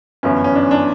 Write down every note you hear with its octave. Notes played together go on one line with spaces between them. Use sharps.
G1 F#2 E3 B3 C#4 E4
C#4
D4
D4